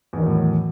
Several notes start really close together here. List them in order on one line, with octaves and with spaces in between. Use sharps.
E2 D#3 F#3 A2